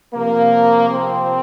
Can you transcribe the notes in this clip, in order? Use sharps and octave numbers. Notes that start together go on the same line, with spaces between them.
C3 F3 A#3
C4